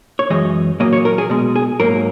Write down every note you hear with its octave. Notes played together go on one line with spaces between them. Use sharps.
C#5
F#2 E3 G#3 D#5
A#2 F#3 A#3 D#5
C#5
A#4
G#4
B2 G#3
G#4
G#2 F#3 A#3 A#4